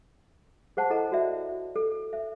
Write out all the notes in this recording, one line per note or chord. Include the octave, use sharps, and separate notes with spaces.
G#4 C5 F#5 A5
E4 A4 D#5 F#5 A#5
F#4 D5 E5
A4
E5